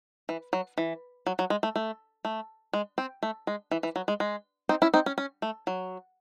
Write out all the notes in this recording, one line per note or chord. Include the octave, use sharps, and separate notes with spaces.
E3
F#3
E3
F#3
F#3
G#3
A3
A3
A3
G#3
C4
A3
G#3
E3
E3
F#3
G#3
G#3
C4 D#4
C#4 E4
C4 D#4
C#4
C#4
A3
F#3